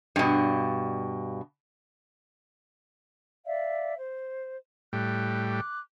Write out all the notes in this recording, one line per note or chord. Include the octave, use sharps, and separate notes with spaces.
G2 B2
D5 E5 F5
C5
A2 G3 F#6
D6 F#6